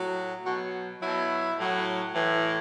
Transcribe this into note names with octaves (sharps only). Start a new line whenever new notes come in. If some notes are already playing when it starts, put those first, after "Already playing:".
Already playing: A2 F#3
B2 F#3 F#4
B2 F#3 E4
A2 F#3
A2 E3